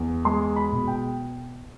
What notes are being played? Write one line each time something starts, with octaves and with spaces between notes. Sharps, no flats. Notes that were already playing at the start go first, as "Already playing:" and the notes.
Already playing: E2
G#3 C6
B5
B2
G5